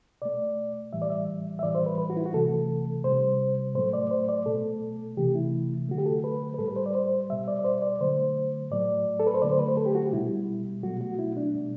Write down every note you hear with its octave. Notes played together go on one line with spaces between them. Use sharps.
B2 A3 D5
A2 E3 G3 E5
D5
E5
E5
A2 E3 G3 D5
C5
B4
B4
F#4
E4
F#4
C3 E3 A3 A4
C3 G3 C5
A2 F#3 A3 C5
D5
C5
D5
B2 A3 A4
C3 E3 A3 G4
E4
D3 F#3 A3 F#4
G4
A4
B4
B4
A2 G3 A4
B4
C5
D5
C5
B2 G3 E5
D5
D5
C5
D5
D3 F#3 A3 C5
A2 F#3 A3 D5
A4
B4
C5
D3 F#3 A3 D5
C5
B4
C5
A4
G4
F#4
G4
B2 G3 E4
B2 F#3 A3 F#4
F#4
E4
D4
B2 G3